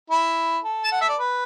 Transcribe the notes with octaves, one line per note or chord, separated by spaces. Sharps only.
E4
A4
A5
F#5
E5
D5
B4